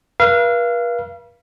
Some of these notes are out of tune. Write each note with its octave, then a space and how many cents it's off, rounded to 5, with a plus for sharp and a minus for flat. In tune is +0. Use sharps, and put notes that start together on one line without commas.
B4 -45 F5 -30